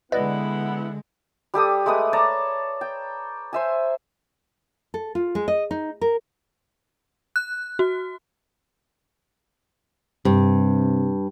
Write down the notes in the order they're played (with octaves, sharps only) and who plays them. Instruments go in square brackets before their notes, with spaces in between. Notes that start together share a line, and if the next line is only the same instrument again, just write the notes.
[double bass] D3 G#3 [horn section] B3 E4 F#5 [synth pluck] B4 D5 D#5
[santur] G3 G4 A4 D#6
G#3 A3 B4 D#6
C#5 D5 A5 A#5
G5
C5 E5 G#5
[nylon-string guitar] A4
F4
G#3
D#5
D#4
A#4
[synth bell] F#6
F#4
[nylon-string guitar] G2 [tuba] C3